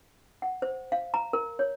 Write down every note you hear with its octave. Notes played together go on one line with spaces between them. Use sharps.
F#5
C5
F5
A#5
A#4
C#5